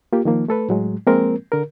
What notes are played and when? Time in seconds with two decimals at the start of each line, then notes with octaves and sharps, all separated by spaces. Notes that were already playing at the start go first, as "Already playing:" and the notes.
0.13 A#3 F4 G4
0.25 D#3 F3 A#3
0.48 A3 A4 B4
0.69 A2 F#3 G#3
1.07 F3 G#3 A#3 C4 A#4
1.52 D3 A#4